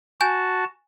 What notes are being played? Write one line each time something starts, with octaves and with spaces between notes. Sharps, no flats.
F#4 G#5 A5 G6